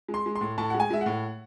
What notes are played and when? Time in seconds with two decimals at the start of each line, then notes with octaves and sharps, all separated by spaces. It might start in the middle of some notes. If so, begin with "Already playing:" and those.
0.09 G#3
0.14 C6
0.26 G#3
0.36 C6
0.41 A2
0.58 A2 A5
0.70 G#3 F#5
0.80 G#5
0.91 G#3 E5
1.01 F#5
1.06 A2